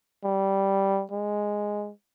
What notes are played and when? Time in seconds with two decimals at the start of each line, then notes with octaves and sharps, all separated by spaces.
0.24 G3
1.12 G#3